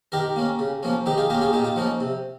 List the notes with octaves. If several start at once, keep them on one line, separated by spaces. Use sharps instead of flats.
D#3 G4 A#4
A#3 C#4
C#3
F3 A#3 C#4
D#3 D#4 G4
F4 G#4
A#3 C#4 G4 A#4
F4 G#4
A#2 D#4 G4
F4
F3 A#3 C#4 D#4
C3